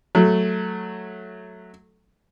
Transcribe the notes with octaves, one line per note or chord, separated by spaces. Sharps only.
F#3 A3